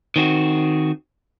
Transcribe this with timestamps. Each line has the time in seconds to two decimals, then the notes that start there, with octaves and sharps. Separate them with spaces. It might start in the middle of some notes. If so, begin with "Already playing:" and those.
0.16 D#3 C4 F#4